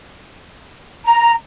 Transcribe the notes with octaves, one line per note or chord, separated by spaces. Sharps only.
A#5